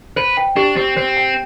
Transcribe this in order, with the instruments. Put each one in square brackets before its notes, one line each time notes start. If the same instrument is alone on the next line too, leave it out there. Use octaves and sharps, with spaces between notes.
[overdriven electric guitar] B4 [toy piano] C5
[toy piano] G5
[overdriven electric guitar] D4 [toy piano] G4
[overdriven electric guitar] C4 [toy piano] G4
[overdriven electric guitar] C4 [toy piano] C5
[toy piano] G5